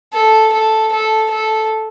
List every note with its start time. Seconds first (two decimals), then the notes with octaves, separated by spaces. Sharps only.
0.14 A4
0.53 A4
0.92 A4
1.31 A4